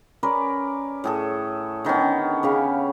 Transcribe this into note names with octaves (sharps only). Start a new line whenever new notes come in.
C#4 A#4 B4 D5
A2 G#4 A4
D3 D#3 B3 C#4
C#3 G4 F5